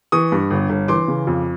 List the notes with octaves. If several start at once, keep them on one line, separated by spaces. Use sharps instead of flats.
E3 C#6 D#6
G2
G1
G1
E3 C6 D6
C#3
F2